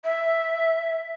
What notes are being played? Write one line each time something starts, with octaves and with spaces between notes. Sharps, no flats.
E5